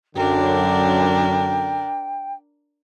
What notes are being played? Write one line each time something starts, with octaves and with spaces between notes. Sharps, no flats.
F#2 D3 D4 A#4 G5